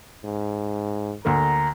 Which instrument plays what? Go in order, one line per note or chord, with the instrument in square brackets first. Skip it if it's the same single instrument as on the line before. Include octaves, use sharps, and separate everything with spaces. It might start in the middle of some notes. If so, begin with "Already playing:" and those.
[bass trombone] G#2
[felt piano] D2 D3 A#3 [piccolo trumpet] A#5